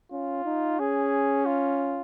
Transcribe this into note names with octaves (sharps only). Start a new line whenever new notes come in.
C#4 F4
D#4
C#4 G#4
F4